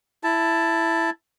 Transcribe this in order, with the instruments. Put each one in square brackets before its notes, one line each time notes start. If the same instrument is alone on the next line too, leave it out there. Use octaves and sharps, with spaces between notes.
[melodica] E4 A5